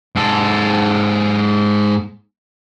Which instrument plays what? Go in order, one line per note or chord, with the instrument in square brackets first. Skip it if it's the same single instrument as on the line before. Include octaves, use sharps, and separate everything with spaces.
[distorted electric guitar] G#2 A4